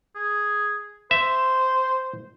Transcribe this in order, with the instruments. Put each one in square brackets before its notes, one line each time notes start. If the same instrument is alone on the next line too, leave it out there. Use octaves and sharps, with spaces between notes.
[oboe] G#4
[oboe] C5 [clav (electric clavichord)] E5